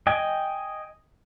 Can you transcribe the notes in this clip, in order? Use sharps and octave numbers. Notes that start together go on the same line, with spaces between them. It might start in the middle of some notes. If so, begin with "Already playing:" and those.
D#5 G5 G#5